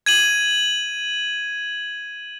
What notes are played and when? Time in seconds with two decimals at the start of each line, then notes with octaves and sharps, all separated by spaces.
0.06 G#6 D#7 F#7